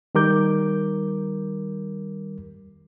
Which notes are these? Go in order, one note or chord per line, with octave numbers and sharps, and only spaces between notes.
D#3 G3 A#4 D6 G6